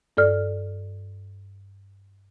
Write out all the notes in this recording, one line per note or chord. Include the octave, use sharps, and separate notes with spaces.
G2 A4 D5 F6